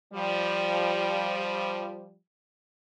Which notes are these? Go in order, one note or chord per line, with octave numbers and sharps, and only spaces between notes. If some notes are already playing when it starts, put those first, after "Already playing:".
F3 G3